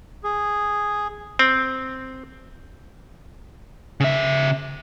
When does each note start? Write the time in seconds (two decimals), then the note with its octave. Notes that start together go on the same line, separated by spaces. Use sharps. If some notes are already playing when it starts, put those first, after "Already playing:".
0.24 G#4
1.39 C4
4.00 C#3 E5